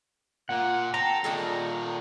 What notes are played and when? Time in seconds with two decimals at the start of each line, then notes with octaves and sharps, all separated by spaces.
0.49 A#2 F#5
0.94 C4 A4 A#5
1.24 A#2 D#3 D4 G#4 A4